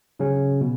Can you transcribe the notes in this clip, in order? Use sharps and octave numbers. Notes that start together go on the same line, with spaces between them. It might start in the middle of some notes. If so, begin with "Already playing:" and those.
C#3 F#3 C#4
B2